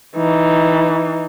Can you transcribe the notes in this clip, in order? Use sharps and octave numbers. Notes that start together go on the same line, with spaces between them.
E3 D#4